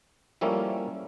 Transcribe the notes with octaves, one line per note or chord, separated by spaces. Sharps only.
F3 G3 A3 A#3 C#4 E4